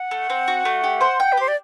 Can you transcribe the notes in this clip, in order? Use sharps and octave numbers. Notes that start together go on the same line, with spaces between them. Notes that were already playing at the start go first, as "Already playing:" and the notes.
Already playing: F#5
A3
C4
F#4
A3
G4
C5
G5
B4
G4 C5
D5